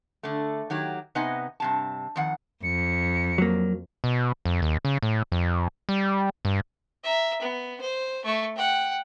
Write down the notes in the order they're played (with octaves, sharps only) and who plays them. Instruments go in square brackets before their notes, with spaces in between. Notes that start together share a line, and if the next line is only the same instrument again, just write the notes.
[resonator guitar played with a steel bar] D3 A3
D#3 F#3 G4
C3 B3 D#4 D#5 F#5 G#5
G2 C3 A5
F2 D#3 F#5
[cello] F2 [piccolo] C#7
[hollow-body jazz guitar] F#3 A#3
[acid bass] B2
F2
D#2
C#3
A2
F2
G3
G2
[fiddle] E5 A#5
B3
C5
A3 C#6
F#5 G5